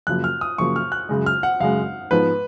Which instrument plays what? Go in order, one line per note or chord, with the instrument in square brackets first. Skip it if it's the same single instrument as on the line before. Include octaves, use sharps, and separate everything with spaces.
[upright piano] F#2 C#3 F3 A#3 [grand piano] F#6
[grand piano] F6
D#6
[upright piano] F#2 C#3 F3 A#3 [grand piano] C#6
[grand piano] F6
F#6
[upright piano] F#2 C#3 G#3
[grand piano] F6
F#5
[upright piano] F#2 C#3 G#3 [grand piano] F5
[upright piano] G#2 F3 B3 [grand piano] B4